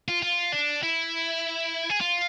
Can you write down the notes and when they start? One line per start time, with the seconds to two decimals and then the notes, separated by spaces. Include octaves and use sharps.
0.08 F4
0.22 F4
0.52 D4
0.83 E4
1.90 G#4
2.01 F4